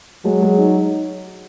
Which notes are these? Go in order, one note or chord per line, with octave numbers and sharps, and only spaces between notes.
F#3 G#3
G#3
D#4